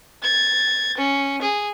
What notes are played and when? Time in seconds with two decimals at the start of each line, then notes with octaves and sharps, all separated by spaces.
0.22 G#6 A6
0.98 C#4
1.42 G#4